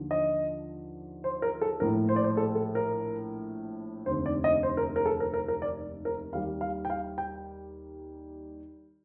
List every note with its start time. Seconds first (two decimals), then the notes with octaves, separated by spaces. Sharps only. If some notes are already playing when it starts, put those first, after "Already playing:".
Already playing: D#2 D3 F3
0.11 D#5
1.24 C5
1.42 A#4
1.61 A4
1.80 A#1 A2 A3 A#4
2.09 C5
2.16 D5
2.24 C5
2.37 A4
2.55 A4
2.75 A#4
4.06 F1 D#2 D3 C5
4.26 D5
4.44 D#5
4.63 C5
4.77 A#4
4.96 A#4
5.05 A4
5.20 A#4
5.34 A#4
5.48 A#4
5.62 D5
6.05 A#4
6.33 D#2 D#3 G3 F5
6.61 F5
6.85 G5
6.90 F5
7.18 G5